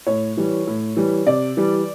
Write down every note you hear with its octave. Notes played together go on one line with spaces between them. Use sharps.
A2 C#5
E3 G3
A2
E3 G3
C3 D5
E3 G3